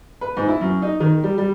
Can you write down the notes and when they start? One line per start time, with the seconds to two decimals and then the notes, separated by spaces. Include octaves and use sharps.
0.21 B4
0.37 G#2
0.48 E4
0.61 F#2
0.82 D#4
1.00 D#3
1.24 G3
1.38 G3